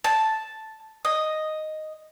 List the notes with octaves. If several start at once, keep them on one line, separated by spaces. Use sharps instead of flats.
A5
D#5